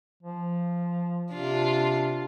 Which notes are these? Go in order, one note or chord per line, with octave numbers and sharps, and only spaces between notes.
F3
C3 D4 F4